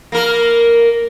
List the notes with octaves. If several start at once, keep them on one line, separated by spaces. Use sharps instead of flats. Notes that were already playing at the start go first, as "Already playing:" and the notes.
A#3 A#4